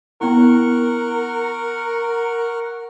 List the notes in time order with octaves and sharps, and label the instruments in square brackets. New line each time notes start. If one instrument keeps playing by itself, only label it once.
[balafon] B3 E4 [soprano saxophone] A#4 [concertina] F#5 C#6 F6